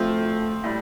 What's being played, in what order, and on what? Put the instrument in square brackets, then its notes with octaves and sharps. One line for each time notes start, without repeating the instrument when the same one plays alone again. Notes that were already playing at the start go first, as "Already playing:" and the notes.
Already playing: [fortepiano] F3 C4 F4 C5 [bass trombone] A3
[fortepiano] A2 G3